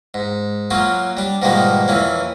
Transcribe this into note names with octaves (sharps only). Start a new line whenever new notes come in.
G#2
F#3 A#3 C#4 F4
G3 D4
G#2 B2 D#3 F3 G3 A#3
F2 E3 A#3 C#4